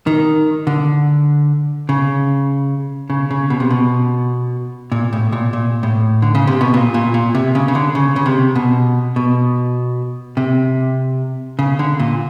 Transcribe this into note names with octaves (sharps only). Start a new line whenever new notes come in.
D#3
D3
C#3
C#3
C#3
B2
C3
B2
A#2
A2
A#2
A#2
A2
D3
C#3
C3
B2
A#2
A#2
A#2
C3
C#3
C#3
D3
C#3
C#3
C3
B2
B2
C3
C#3
D3
A#2